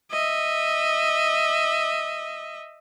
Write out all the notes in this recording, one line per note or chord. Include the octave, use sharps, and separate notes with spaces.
D#5 E5